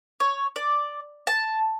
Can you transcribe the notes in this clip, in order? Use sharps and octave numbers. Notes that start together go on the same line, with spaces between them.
C#5
D5
A5